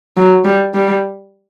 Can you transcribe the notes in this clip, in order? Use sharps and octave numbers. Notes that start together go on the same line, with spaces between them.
F#3
G3
G3